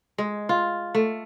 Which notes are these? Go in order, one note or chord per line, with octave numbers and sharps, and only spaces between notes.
G#3
F4
A3